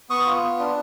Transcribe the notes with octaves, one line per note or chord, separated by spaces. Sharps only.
B3 C#6 D#6
F4
B3
D4